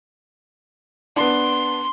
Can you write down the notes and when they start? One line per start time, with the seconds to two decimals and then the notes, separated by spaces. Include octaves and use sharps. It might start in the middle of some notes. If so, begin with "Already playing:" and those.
1.16 B3 D4 C6